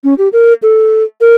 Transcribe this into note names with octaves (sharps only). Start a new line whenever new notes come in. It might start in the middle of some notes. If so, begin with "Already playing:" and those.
C#4
G4
A#4
A4
A#4